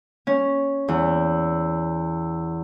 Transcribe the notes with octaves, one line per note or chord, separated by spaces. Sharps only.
C#4
E2